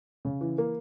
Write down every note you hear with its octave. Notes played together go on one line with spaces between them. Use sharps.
C#3
E3
A#3